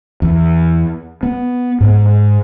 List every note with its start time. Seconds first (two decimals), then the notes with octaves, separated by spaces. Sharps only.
0.22 E2
1.23 B3
1.80 G#2